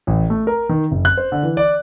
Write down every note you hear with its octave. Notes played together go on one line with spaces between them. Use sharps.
A1
A3
A#4
D#3
F#1
F#6
C5
D3
E3
D5